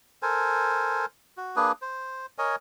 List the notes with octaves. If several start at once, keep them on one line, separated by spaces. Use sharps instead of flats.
A4 A#4 C5 G#5
F#4
A#3 D4 G#4 B4
C5
A#4 C#5 D#5 G#5